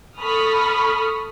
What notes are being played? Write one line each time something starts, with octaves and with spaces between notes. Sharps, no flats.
A4 B5 C#6 D#6 F6